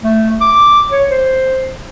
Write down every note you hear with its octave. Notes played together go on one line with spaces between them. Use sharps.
A3
D6
C#5
C5